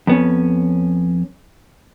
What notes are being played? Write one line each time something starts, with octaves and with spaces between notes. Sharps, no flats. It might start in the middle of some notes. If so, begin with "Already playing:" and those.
F2 B3 C#4